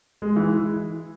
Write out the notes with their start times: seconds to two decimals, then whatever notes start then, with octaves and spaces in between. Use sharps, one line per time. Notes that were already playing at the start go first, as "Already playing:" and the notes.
0.22 G#3
0.36 E3